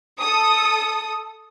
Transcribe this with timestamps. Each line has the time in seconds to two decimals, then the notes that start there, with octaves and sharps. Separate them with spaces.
0.19 A4 D#6